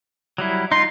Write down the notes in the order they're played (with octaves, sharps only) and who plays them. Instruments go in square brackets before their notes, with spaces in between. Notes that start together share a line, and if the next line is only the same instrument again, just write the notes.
[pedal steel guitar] F#3 G3 E4
[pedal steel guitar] D#4 F4 [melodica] C6